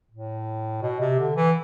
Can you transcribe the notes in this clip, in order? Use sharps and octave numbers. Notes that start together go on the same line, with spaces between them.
A2
B2
C3
D3
E3